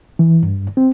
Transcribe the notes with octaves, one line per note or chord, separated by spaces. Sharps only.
E3
G2
C4